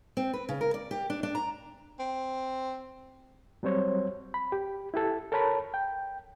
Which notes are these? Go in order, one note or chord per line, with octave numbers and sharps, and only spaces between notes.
C4
B4
C#3
A#4
D5
G4
D4
D4
A#5
C4
F#3 G3 C4 C5 C#5
B5
G4
E4 G4 A4
A4 A#4 C#5 A5 B5
G5